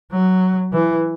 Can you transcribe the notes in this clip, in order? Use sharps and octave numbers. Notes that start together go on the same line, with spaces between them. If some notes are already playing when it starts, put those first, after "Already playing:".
F#3
E3